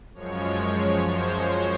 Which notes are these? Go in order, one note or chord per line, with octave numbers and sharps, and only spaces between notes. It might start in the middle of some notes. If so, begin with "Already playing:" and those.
F#2 F3 G#3 C#5
C5